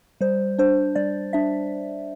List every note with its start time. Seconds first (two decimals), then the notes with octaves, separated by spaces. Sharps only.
0.21 G3 C5
0.58 D4 C5
0.95 G3 D5
1.33 D4 E5